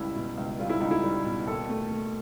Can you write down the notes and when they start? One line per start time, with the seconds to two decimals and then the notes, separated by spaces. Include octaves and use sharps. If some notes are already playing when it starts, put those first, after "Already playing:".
Already playing: C#2 G3 E4
0.15 B2
0.37 C#2
0.59 G3 F4
0.70 E4
0.81 C#2 D#4
0.91 E4
1.03 G3
1.25 B2
1.47 D#2 A4
1.69 A3
1.91 A3